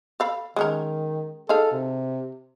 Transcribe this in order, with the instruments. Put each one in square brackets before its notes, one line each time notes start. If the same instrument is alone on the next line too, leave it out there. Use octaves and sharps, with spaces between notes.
[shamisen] A4 F5 B5
[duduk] D#3 [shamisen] G#3 C#4 A#4
[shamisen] D#4 G#4 F5 [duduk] A4
[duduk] C3